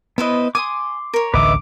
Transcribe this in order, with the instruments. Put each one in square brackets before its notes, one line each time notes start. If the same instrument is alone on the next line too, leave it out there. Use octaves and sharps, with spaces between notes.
[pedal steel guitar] B3 D#5 [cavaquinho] E4 B4 C5
[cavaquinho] G#5 D#6 [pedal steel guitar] C6 D6
[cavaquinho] A#4 C#5
[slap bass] A1 D2 D3 [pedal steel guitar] B4 D#5 E5 [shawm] D6